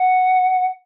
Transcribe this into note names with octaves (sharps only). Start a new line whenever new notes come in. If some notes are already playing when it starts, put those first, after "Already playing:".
Already playing: F#5